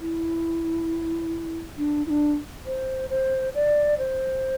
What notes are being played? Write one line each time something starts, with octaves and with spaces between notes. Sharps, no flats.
E4
D4
E4
D4
C5
C5
D5
C5